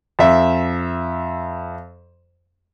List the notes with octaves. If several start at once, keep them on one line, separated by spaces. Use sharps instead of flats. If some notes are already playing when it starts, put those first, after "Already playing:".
F2 E5